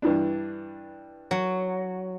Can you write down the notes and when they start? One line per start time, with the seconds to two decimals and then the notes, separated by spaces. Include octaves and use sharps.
0.02 G2 E3 D4
1.31 F#3